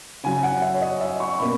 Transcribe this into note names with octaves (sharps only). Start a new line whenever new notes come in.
C#3 F#3 C#4 G#5
F#5
E5
C#5
D#5
E5
C#6
B2 A#3 C#4 B5